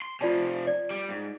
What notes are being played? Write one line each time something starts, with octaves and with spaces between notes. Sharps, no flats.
C6
C3 F3 F4 D5 A5
D5
G3
G#2